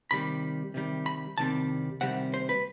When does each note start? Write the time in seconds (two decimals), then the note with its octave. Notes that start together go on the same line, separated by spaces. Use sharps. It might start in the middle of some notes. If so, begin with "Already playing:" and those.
0.11 C3 D#3 G3 B5
0.74 C3 D#3 G3
1.06 B5
1.38 C2 C3 D#3 G3 C4 A5
2.01 C2 C3 D#3 G3 C4 F#5
2.34 C5
2.49 B4